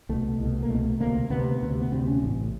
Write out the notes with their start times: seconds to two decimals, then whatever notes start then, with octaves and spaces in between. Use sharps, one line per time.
0.09 C2 B2 A3
0.40 C2 B2
0.63 A#3
0.70 C2 B2 A3
1.00 D2 C3 A#3
1.30 D2 C3 B3
1.62 D2 C3
1.81 B3
1.92 D2 C3 C4
2.07 C#4
2.22 A1 A2